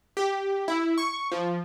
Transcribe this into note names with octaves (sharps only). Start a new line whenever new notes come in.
G4
E4
C#6
F3